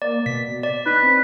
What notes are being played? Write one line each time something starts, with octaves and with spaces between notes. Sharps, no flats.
A#3 D5
B2 B6
D5
D#4 B4
C4